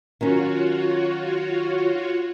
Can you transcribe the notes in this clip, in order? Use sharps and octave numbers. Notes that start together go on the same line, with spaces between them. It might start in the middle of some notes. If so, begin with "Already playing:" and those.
D#3 F#3 C#4 F4 F#4 C#5